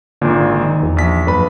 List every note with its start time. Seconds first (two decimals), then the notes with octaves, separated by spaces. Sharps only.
0.22 G#1 A#2 D3
0.63 D#3 D#4
0.83 E2
0.97 A#1 B6
1.27 A#1 F#2 B4 B5